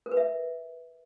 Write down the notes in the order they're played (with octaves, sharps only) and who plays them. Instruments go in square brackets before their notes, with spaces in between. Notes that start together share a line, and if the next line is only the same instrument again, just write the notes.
[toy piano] A#4
B4
E5